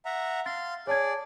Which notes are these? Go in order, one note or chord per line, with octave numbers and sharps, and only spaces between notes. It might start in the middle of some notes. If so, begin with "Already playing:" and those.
E5 F#5 A#5
F5 C6 A6
G#4 C#5 D5 A5 G#6